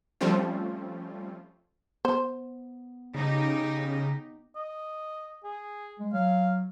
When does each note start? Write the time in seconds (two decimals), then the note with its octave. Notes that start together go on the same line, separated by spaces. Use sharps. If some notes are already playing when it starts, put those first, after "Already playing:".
0.21 F3 G3 A3 C4 C#4 F4
2.05 B3 C5
3.14 C#3 D#4 G4
4.55 D#5
5.44 G#4
6.00 G#3
6.13 F#3 F5